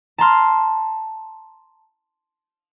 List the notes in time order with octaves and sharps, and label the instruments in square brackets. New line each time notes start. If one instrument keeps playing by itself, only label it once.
[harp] A5 A#5 C6 F6